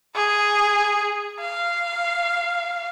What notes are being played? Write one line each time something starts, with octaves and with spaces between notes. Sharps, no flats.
G#4
F5